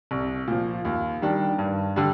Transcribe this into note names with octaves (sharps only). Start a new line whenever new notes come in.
C2
A#2 F3
D#2
D#3 G3 D4
G2
D3 G3 D4